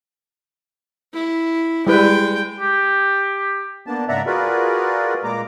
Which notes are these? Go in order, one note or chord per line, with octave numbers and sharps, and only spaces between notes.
E4
G3 G#3 E4 B4 G5
G4
A#3 B3 D4 A5
G#2 C#3 D5 E5 F#5 A#5
F4 F#4 G#4 A#4 B4 D5
A#2 G#3 A#3 A#5 D6